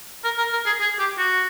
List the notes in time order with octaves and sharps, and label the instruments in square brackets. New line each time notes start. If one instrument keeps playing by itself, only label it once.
[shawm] A#4
A#4
A#4
G#4
G#4
G4
F#4